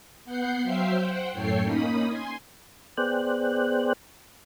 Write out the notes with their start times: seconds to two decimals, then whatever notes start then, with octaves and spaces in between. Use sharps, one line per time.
0.25 B3 F#5 G6 C7
0.62 F#3 C5 E5 F5 G5 C7
0.99 C5 F#5 G5
1.32 F#2 A2 A4 C#5 G5 C7
1.62 A#3 C#4 D#4 B5 D#6
2.05 G#5 C6
2.98 B3 G#4 C5 D5 G5 F#6